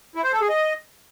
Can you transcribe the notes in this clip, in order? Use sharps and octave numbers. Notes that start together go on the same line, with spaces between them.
E4
C5
A4
G#4
D#5